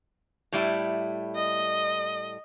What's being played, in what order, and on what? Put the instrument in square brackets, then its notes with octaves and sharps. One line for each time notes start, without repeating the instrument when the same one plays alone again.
[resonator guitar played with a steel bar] A2 G3 E4
[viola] D#5